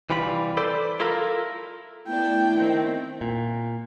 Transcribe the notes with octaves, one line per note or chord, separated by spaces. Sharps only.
C2 E3 G3 F4 B5
A4 B4 C5 D5
E4 F4 A4 A#4 F5
A3 B3 D4 E4 G5
D#3 C4
A#2